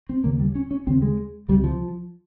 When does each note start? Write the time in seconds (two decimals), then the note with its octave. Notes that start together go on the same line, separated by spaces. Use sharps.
0.09 C4
0.24 D#2 C#3 A#3
0.40 G3
0.55 C#4
0.71 C#4
0.87 D#2 C#3 C4
1.02 G#3
1.48 C#2 C3 G3
1.64 F3